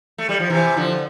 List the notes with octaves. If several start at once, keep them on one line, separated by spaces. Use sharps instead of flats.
A3
G3
F3
C3 E3
D3 F3